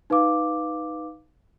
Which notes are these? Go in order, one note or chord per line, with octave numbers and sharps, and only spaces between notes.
D#4 B4 F5 D6